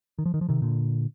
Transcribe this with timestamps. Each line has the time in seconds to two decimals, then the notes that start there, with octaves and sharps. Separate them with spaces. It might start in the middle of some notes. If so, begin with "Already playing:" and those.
0.19 D#3
0.26 F3
0.34 D#3
0.41 F3
0.49 C3 D#3
0.62 A#2 D3